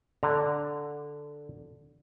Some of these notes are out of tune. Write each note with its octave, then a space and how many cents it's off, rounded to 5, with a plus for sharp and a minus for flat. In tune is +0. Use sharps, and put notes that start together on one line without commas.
D3 +0 A#5 +0